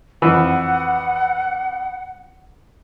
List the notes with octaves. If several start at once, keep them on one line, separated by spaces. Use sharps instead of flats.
F2 E3 F#5